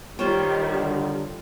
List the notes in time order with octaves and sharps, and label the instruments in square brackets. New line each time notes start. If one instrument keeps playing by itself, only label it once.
[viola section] D#3 G3 [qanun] F4 C5 C#5
[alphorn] D3